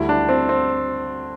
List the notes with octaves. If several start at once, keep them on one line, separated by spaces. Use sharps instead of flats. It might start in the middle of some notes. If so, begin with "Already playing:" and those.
Already playing: D2 D3 G3 E4
D4
C4
C4